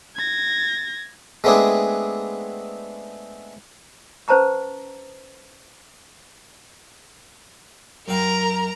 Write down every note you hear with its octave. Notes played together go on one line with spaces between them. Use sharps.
G#6 A#6
G#3 A3 B3 C4 D4 G#4
C#4 B4 C5 A5 A#5 C#6
F#2 C4 A#4 F5 A#5